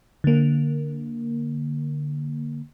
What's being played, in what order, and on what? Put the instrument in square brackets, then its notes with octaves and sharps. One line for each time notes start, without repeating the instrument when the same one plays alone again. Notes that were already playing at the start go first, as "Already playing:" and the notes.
[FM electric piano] D3 A#3